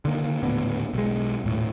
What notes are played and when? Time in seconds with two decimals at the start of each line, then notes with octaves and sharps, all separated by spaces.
0.05 D3 D#3 A#3
0.43 D#1 A2 D3 B3
0.94 B1 G#3
1.44 D#1 A2